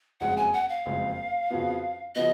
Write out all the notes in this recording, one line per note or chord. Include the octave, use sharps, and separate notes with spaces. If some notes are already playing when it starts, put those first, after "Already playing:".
F#1 F2 C#3 G#3 F#5
G#5
F#5
F5
F#1 F2 C#3 G#3
F2 C#3 F3 B3 F#4
C#3 F3 B3 F#4 D#5